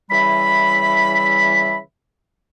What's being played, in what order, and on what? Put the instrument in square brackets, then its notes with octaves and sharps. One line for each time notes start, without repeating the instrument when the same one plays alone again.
[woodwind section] C#3 E3 G3 E5 B5